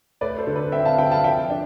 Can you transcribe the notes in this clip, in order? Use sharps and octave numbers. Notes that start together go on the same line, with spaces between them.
A3 B4 D5
A4 C5
D3
B4
C4 E5 G5
F5 A5
D3 G5 B5
F5 A5
F3 E5 G5
D4